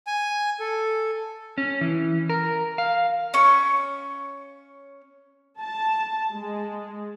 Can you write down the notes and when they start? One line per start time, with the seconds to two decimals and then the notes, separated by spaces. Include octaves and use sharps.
0.07 G#5
0.60 A4
1.58 C#4
1.81 E3
2.29 A#4
2.78 F5
3.34 C#4 C#6
5.61 A5
6.33 G#3